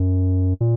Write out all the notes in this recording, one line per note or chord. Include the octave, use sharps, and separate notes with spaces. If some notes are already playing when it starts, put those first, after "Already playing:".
Already playing: F#2
A#2